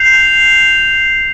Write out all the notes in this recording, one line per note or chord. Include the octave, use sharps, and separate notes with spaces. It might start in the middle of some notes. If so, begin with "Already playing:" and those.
Already playing: G6 C7 F7